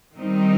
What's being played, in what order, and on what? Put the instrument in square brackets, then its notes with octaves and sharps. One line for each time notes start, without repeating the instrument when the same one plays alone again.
[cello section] D#3 G3 C4 D#4